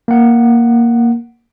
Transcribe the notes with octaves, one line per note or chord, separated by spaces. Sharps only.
A#3 F#5